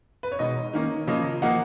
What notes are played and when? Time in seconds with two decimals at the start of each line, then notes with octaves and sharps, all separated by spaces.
0.23 B4
0.32 C#5
0.39 B2 G#3 D#4 D#5
0.73 D#3 A#3 C#4
1.07 C#3 F3 A#3 C#4 D#5
1.42 F3 A#3 D#4 F#5